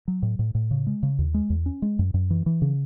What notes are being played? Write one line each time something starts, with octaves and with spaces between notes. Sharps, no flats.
F#3
A2
A2
A2
C#3
G#3
C#3
D#2
G#3
E2
C#4
G#3
F#2
F#2
E3
E3
C#3